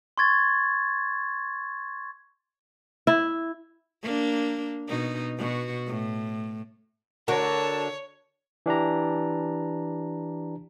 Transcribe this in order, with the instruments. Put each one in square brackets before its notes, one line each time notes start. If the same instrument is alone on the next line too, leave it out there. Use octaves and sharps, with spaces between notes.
[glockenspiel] C6 C#6 G#6 A6
[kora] E4
[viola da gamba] A#3 D4
B2 D#4
B2 F#4
A2
[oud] D3 F#4 A#4 [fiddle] C#5 [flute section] A5
[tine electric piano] E3 D4 G4 A#5